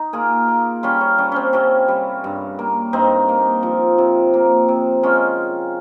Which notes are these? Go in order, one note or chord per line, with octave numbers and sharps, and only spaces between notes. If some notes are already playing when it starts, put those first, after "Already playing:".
Already playing: D#4
A#3 F4 G#4
A#3
G3 C#4 F4
C#4
G3 C#4
C4 C#4
C3 C#4
G3
G2
A#3
G2 C4 D#4
A#3
F3
C3
A#3
C3
G#3 C#4 F4